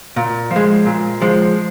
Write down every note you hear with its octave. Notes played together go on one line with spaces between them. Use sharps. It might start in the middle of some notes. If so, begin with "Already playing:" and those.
A#2
F3
G#3
A#2
F3 G#3